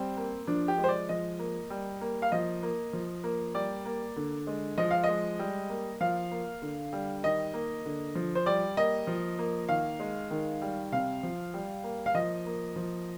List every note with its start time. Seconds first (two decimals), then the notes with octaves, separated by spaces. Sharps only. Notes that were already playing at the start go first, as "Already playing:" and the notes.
Already playing: G3 C4
0.17 A#3
0.47 F3 D4
0.68 G4
0.78 G#3
0.84 C5
0.88 D5
1.09 F3 D#5
1.39 A#3
1.70 G3
2.01 A#3
2.22 F5
2.32 F3 D#5
2.63 A#3
2.93 F3
3.24 A#3
3.54 G3 D5
3.85 A#3
4.16 D3
4.47 G#3
4.78 F3 D#5
4.91 F5
5.04 D#5
5.09 G#3
5.39 G3
5.70 A#3
6.00 F3 F5
6.31 A#3
6.62 D3
6.93 G3
7.23 D#3 D#5
7.54 A#3
7.85 D3
8.15 F3
8.35 C5
8.46 G3 D5
8.77 A#3 D#5
9.07 F3
9.39 A#3
9.69 D#3 F5
10.00 G#3
10.31 D#3
10.62 G3
10.92 C3 F5
11.23 F3
11.54 G3
11.84 A#3
12.06 F5
12.15 F3 D#5
12.46 A#3
12.76 F3